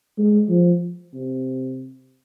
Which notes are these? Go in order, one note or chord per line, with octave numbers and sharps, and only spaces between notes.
G#3
F3
C3